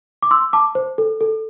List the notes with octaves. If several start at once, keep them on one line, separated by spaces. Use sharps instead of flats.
D6
C6 E6
A5 D6
C5
A4
A4